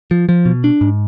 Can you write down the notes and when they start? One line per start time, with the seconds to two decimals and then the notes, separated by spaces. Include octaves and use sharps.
0.11 F3
0.29 F3
0.45 B2
0.64 D4
0.81 G#2